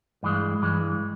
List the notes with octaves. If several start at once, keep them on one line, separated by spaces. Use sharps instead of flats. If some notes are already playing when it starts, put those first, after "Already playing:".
G2 E3 G#3
G2 E3 G#3